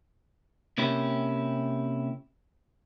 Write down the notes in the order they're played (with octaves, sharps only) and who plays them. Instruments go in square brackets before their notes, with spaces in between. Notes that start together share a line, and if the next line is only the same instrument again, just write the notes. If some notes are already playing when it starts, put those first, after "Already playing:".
[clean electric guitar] C3 A#3 C#4 E4 G4